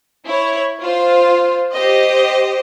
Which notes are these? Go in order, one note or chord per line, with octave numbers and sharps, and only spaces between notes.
E4 C#5
F4 C5
G4 C5 D#5